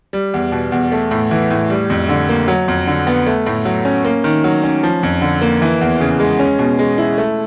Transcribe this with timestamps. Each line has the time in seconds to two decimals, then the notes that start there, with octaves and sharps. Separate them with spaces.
0.13 G3
0.34 E2
0.52 B2
0.72 E2
0.92 A3
1.11 A2
1.31 E3
1.50 A2
1.70 G3
1.90 F2
2.09 D3
2.29 A#3
2.48 F#3
2.68 F2
2.87 D3
3.07 B3
3.26 A3
3.46 A2
3.65 F#3
3.85 C#4
4.05 A#3
4.24 D#3
4.44 F#3
4.63 C#4
4.83 F3
5.03 F2
5.21 D3
5.41 A#3
5.62 E3
5.81 E2
6.00 C#3
6.20 G#3
6.39 C#4
6.59 B2
6.79 G#3
6.98 E4
7.18 A3